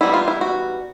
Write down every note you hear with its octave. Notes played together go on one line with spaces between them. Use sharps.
E3 G3 B3 D#4 E4
F4
E4
F#4